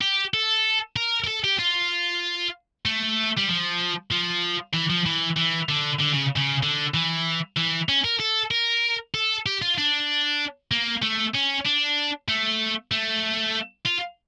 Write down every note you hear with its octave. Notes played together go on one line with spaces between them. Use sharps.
G4
A4
A#4
A#4
A4
G4
F4
A3
G3
F3
F3
E3
F3
E3
E3
D3
D3
C#3
C#3
D3
E3
E3
C#4
A#4
A4
A#4
A4
G4
F4
D4
A#3
A3
C#4
D4
A3
A3
F4